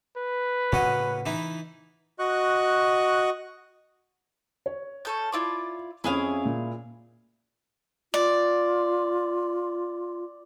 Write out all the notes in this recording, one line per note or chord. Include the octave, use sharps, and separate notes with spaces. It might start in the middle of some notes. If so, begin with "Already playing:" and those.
B4
A2 C#3 A#3 C#4 F#4 D#5
E3 D#4 E4
F#4 D#5 C#6 F#6
C#5
C#4 A4 G6
E4 F4 D5
F2 C#4 E4 G#4 F5
A#2
F4 D5